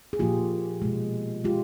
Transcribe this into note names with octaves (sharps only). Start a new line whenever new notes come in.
G#4
A#2 F3 A#3 F4 G4
B2 G#3
G#3 F4 G4